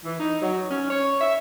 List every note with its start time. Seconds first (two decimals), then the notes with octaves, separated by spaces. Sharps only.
0.04 E3
0.19 D#4
0.42 F#3
0.70 C#4
0.90 C#5
1.21 E5